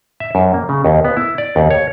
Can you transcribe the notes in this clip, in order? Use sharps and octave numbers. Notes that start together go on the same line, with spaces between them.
E5
F#2
A#3
C#3
D#2
B3
E4
D5
D#2
C#5